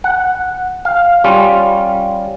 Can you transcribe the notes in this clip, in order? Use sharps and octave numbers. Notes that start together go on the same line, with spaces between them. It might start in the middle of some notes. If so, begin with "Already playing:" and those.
F#5
F5
G3 C#4 F4